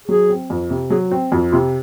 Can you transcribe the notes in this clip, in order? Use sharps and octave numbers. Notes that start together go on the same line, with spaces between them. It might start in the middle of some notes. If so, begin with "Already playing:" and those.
F#3 G#4
C4
F2
C3
F#3 G#4
C4 F#4
F2 F#4
C3 F4